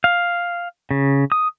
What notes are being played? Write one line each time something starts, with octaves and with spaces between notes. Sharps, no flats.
F5
C#3
D#6